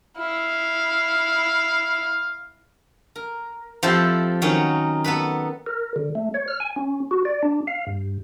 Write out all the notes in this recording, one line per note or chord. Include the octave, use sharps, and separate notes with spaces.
E4 F5
A#4
F3 C4 E4 G4 A4 C5
D#3 F#3 C#4 D#4
B3 A4 B4 B5
A#4
D3
A3
C#5
F6
G#5
C#4
F#4
D5
D4
F5
G2